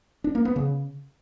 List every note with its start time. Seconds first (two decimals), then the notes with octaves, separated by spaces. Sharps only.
0.24 D4
0.35 A#3
0.45 B3
0.56 C#3